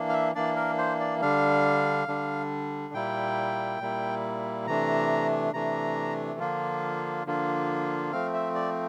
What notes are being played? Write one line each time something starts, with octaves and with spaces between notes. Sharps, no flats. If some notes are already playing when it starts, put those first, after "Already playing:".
Already playing: E3 A#3 D4
F5
E5
E3 A#3 D4 D5
A#4
C5
D5
D3 G3 D4 F5
D3 G3 D4
A#2 G3 A#3 E4 G5
A#2 G3 A#3 E4
C3 E3 A3 D4 A#5
C3 E3 A3 D4 A#5
D3 F3 A#3 D4 F4
D3 F3 A#3 D4 F4
F3 A3 C4 F5
E5
D5